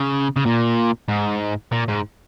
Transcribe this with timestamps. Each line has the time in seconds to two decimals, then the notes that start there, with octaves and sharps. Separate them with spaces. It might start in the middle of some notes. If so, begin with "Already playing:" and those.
Already playing: C#3
0.36 C#3
0.46 A#2
1.08 G#2
1.72 A#2
1.88 G#2